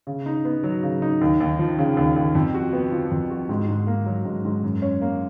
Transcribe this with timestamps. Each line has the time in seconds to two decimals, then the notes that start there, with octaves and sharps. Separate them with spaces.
0.07 C#3
0.26 D#4
0.45 B3
0.64 F#3
0.83 C#3
1.02 D#4
1.21 D#2
1.40 D#2
1.59 F3
1.79 C#3
1.97 D#2
2.16 D#2
2.35 F2
2.54 F#4
2.73 B3
2.92 F3
3.11 F2
3.30 F#4
3.49 G#2
3.68 G#2
3.87 A#3
4.06 F#3
4.25 G#2
4.45 G#2
4.63 F#2
4.82 C#4
5.01 A#3